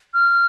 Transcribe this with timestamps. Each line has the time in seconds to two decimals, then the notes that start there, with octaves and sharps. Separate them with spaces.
0.14 F6